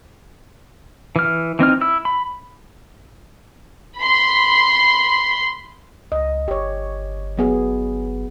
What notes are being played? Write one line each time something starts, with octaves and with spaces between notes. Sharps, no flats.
E3 F6
E3 C4 D#4 F6
E4 E6
B5
B5 C6
C#2 D#5
G1 G4 C#5
F#3 B3 G#4